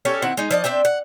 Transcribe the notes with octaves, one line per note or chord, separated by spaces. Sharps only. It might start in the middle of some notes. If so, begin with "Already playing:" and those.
C#4 G4 A4 C#5
D#3 C4 E4 F#5
G#3 D#4
F3 D5 D#5
C4 D4 E5 G5
F#5